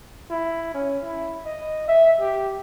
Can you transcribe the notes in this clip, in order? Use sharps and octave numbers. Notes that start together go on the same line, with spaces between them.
E4
C#4
E4
D#5
E5
G4